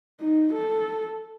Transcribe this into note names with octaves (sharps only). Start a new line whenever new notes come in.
D#4
A4